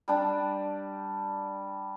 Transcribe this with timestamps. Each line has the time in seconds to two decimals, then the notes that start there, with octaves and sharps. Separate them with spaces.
0.08 G3 D4